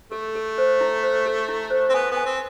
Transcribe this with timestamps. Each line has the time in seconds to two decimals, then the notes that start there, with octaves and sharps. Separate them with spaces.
0.12 A3 A4
0.35 A4
0.58 C5
0.81 E4
1.03 C5
1.26 A4
1.49 E4
1.70 C5
1.89 C4
1.94 B3 G#5
2.12 B3
2.17 G#5
2.25 C4